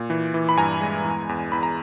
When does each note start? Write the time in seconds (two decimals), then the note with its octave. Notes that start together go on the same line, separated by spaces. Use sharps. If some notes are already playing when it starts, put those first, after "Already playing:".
Already playing: A#2
0.10 E3
0.34 E3
0.49 B5
0.57 G2 G#5 A#5
0.81 G#3
1.04 E2
1.29 E2
1.52 E2 B5
1.63 A#5